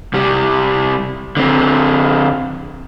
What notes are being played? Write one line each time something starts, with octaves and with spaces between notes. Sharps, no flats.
C2 G3
D3 C4